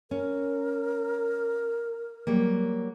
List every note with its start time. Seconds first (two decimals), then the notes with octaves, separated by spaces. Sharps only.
0.11 C#4 A#4
2.27 F#3 G3 A#3